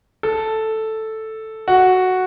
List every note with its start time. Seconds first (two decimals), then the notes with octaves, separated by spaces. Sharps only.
0.23 A4
1.68 F#4